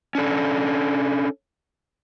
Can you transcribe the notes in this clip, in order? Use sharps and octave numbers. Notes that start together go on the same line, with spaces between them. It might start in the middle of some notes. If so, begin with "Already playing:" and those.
C#4 D4 A4